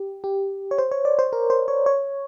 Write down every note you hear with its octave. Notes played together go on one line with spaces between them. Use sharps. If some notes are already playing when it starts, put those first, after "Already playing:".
Already playing: G4
G4
C#5
C5
C#5
D5
C5
A#4
C5
C#5
C#5